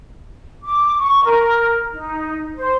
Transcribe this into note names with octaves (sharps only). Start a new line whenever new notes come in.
D6
C#6
A#4
D#4
C5